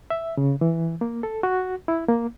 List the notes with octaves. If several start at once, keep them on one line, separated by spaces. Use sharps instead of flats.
E5
C#3
E3
A#3
A4
F#4
E4
A#3